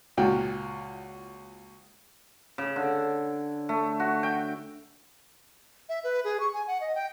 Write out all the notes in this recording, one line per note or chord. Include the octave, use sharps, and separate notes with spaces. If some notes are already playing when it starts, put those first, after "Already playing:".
C#2 A#2 F#4 G5
C#3
D3
A3
F#4
G5
E5
B4
G#4
C#6
G#5
F#5
D#5
G5